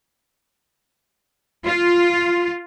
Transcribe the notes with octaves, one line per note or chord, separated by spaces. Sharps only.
F4